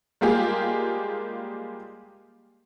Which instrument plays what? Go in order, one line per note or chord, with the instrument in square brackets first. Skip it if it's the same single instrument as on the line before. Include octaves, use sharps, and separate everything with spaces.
[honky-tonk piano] G3 G#3 A#3 F4 G4 G#4